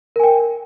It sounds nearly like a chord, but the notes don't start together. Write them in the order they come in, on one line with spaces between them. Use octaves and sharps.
A#4 G#5 G5